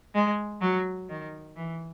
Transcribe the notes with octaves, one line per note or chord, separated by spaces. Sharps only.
G#3
F#3
D#3
E3